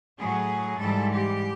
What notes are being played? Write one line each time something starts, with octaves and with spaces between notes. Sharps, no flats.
A2 F#3 G#4
G#2 E3 G3 A4
G4